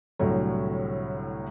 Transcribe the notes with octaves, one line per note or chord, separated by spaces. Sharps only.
C2 A2 D3 F#3